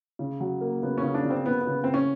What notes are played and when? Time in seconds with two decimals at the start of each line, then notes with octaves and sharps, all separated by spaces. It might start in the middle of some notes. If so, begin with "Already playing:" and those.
0.19 C#3
0.40 F#3
0.61 A#3
0.83 C#3 B3
0.98 C#4
1.03 C#3
1.14 D4
1.25 C#3
1.30 C4
1.46 C#3 B3
1.61 B3
1.67 C#3
1.84 C4
1.88 C#3
1.94 C#4